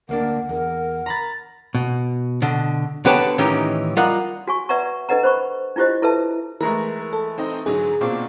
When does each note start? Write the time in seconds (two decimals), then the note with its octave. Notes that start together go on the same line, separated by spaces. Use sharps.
0.09 D2 A#3 D4 A#4 F#5
0.49 E2 A#4
1.06 A#5 B5 A6
1.75 B2
2.42 B2 D3
3.05 D3 B3 G4 B4 C#5 A5
3.38 A2 D#3 E3 C#4 D#4 G4
3.97 G3 F4 A#4 D#5 F#5
4.47 F#4 G#5 C#6
4.69 B4 D5 E5 F#5 A#5 C#6
5.09 D4 A4 B4 D#5 F#5 A#5
5.24 C5 B5 C#6
5.76 D4 E4 F4 G4 C5 D#5
6.02 E4 A4 B4 E5 A5
6.61 E3 G#3 A3 A#4 A#5
7.13 A4
7.38 C4 D#4 D#5
7.66 G#2 D3 F#3 G#4
8.01 B2 A#3 C4 D4 F4 C#6